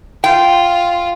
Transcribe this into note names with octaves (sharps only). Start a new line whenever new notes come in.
F4 G5